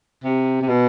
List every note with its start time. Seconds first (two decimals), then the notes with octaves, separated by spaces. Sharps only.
0.24 C3
0.62 C3
0.68 B2